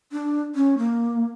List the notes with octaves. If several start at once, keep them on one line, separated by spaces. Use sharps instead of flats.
D4
C#4
A#3